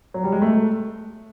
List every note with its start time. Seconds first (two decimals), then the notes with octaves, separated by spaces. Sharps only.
0.14 F#3
0.24 G3
0.32 G#3
0.42 A3